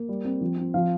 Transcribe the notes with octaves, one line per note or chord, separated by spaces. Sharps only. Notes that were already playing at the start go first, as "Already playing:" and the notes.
Already playing: A#3
G3
C4
F3
C4
F3 F5